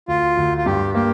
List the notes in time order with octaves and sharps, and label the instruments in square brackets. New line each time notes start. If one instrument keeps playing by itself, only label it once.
[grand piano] D2 [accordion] F4
[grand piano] D2
[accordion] F4
[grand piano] G2 [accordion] G4
[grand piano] A#3 [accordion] G4